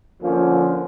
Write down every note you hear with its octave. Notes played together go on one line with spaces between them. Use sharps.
D3 F3 A#3 C#4